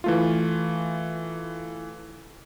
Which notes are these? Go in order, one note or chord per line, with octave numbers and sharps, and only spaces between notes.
E3 A3 F4